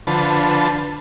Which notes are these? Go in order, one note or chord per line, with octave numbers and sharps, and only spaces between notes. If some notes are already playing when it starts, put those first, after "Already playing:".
D3 F3 B4 A5